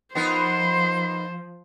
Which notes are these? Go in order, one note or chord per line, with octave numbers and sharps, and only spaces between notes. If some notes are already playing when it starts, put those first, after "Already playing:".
F3 B3 D#4 A#4 C5 C6